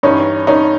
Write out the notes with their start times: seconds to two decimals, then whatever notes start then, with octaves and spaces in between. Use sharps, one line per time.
0.03 G2 E3 G3 C#4 D#4
0.47 C#4 D#4